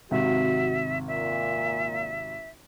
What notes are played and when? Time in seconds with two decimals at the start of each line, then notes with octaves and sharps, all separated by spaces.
0.11 G#1 C3 F#4 E5
1.08 A#2 E5